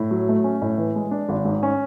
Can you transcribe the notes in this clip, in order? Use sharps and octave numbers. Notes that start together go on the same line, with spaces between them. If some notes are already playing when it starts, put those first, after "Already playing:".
Already playing: A2
F#3
A3
C#4
A2
E3
G#3
D4
G#1
G#2
C#4